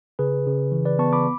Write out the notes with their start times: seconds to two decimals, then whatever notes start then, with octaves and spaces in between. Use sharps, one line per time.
0.19 C#3 G#4 B4
0.46 C#3
0.72 E3
0.85 B4 D5
0.99 B3 A5 C#6
1.13 B5 D6